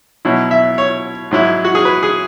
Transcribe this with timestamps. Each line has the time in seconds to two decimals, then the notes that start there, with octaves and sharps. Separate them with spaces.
0.25 B2 F#3 E4
0.51 E5
0.78 C#5
1.31 G#2 F#3 E4
1.65 F#4
1.75 G#4
1.85 B4
2.03 G#4